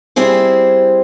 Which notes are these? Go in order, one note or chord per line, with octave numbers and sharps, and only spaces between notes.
G3 C4 E4 G#4 C5